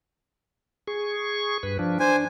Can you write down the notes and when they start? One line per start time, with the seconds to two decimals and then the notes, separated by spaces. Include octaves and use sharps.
0.87 G#4 C#6
1.63 G2 B4
1.79 F3 D4
2.00 D4 C5 G#5